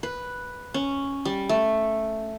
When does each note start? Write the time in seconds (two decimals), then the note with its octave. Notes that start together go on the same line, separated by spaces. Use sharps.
0.03 B4
0.74 C#4
1.25 G3
1.49 A3